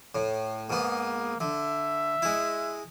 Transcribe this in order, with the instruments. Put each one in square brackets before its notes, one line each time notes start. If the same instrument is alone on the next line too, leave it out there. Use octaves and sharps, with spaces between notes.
[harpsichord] A2
[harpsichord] G#2 B3 [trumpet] A#3
[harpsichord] D3 [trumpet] E5
[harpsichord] G#3 E4